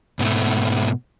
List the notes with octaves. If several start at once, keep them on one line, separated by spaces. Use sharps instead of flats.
G#2 B2 A3